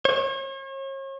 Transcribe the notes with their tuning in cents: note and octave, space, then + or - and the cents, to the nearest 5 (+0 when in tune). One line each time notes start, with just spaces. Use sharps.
C#5 -40